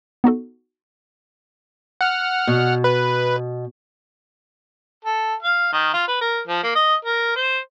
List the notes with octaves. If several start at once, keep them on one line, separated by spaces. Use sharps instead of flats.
B3 D#4 F#4 A4
F#5 F6
B2
B4
A4
F5
D#3
F4
B4
A#4
F3
A#3
D#5
A#4
C5